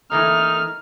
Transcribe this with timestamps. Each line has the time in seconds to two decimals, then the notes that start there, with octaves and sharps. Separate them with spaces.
0.12 E3 A3 A#3 D#4 F6